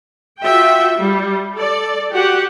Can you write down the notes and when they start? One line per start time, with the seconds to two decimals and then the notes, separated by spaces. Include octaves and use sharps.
0.41 F4 F#4 E5 G5
0.95 G3
1.54 A4 D5
2.10 F#4 G4 F#5